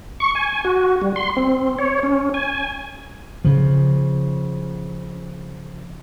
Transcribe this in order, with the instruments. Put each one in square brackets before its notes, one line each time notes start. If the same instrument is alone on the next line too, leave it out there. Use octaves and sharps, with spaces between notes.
[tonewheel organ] C#6
G#5
F#4
G3
C6
C4
C#5
C#4
G#5
[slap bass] C#3 F3